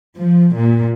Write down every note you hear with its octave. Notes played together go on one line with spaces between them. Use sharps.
F3
A#2